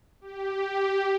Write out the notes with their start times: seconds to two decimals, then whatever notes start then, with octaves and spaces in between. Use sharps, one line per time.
0.21 G4